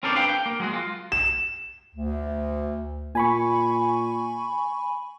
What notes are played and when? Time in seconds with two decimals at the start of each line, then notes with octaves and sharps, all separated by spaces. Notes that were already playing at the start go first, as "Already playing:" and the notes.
0.03 C4 C#4 A4 A#4 C5 D5
0.15 D4 G4 B4 F5 G5
0.29 G5
0.46 A#3
0.60 F#3 G#3 F#4
0.73 F4
1.12 E7
1.95 D2
3.15 A#2 G#5 B5 C#6